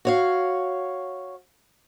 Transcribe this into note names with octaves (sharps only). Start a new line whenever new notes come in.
F#4 C#5 F5